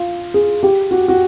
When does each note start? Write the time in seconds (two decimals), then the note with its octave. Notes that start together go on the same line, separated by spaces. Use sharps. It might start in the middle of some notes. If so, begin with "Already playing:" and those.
Already playing: F4
0.34 G#4
0.63 G4
0.91 F#4
1.08 F#4